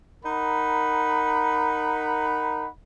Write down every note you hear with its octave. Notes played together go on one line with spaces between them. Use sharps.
D#4 A#4 F#5 B5